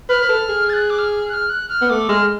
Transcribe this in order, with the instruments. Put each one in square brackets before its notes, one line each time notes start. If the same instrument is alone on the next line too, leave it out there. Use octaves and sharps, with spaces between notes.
[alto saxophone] B4 [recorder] F6
[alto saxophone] B4
A4
G#4
[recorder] A6
F#6
D6
F6
F#6
F6
F#6
F6
[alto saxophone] B3
[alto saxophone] A3 [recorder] D6
[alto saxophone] G#3 [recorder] F6